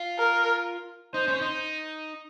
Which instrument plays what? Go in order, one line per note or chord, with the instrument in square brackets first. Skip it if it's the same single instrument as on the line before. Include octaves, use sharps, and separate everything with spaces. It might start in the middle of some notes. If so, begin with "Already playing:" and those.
Already playing: [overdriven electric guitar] F4
[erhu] A#4
[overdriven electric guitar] D#4 [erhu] C5
[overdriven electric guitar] C#4
D#4